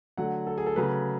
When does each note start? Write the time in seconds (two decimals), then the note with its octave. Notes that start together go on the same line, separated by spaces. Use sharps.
0.17 D3 F#3 A3 F#5
0.47 A4
0.58 G#4
0.66 A4
0.76 C#3 F#3 A3 B4